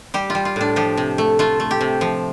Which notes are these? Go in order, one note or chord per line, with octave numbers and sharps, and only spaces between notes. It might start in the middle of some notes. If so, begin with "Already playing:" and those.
G3 G4
F4
G3
F4
A2 D4
F3 G4
C3
A3
A3 F4
A3
G4
C3
F3